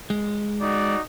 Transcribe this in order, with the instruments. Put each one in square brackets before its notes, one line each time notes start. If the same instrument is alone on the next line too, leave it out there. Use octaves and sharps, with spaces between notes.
[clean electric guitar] G#3
[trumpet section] D#4 F#4 D5